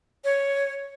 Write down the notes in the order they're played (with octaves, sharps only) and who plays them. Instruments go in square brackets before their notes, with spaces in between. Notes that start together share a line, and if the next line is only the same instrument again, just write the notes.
[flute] C#5